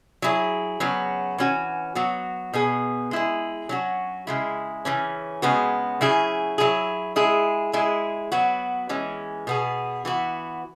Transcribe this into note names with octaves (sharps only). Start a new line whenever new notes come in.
F#3 E4 G#4
C#3 F#3 B3 F#4
E3 C#4 F#4
F#3 B3 F#4
B2 B3 G#4
G#3 E4 G#4
F#3 C#4 F#4
C#3 G#3 E4
C#3 E3 C#4
C#3 G#3 B3 F#4
C#3 F#3 E4 G#4
F#3 E4 G#4
G#3 E4 G#4
G#3 E4 G#4
F#3 B3 F#4
E3 G#3 C#4
B2 B3 G#4
E3 B3 F#4